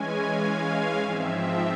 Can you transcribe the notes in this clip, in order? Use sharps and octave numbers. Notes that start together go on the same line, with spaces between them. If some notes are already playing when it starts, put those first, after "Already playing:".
Already playing: E3 G#3 C#4 G#5
F5
G#2 F3 C4 E5